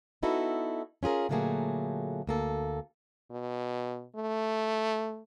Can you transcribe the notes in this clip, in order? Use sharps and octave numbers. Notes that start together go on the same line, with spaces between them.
B3 D#4 E4 F#4 A4
C#4 F4 G#4 A#4
A#2 D3 F#3 A3 A#3 G#4
D2 A#3 A4
B2
A3